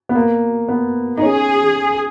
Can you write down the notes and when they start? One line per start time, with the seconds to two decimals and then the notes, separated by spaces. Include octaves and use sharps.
0.09 B3
0.15 A#3
0.69 B3
1.18 D#4
1.22 C#4 G#4